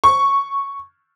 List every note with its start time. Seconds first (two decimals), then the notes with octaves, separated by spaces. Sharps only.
0.04 C#6